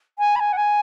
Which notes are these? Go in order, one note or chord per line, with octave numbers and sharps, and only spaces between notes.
G#5
B5
G#5
F#5
G#5